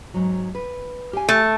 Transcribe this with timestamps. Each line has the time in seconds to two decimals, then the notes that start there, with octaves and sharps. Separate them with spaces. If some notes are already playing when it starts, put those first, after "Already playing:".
0.14 G#2 F#3
0.55 B4
1.13 G4 F5 G#5
1.29 A3